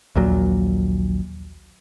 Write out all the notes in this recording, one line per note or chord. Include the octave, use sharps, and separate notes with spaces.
A#1 D#2 A#2 F#3